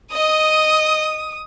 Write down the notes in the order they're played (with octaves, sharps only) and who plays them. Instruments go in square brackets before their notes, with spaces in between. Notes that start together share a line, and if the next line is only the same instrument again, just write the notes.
[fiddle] D#5 [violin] D#6